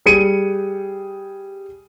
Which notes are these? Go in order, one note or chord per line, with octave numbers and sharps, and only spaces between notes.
G3 G#4 C#7 D#7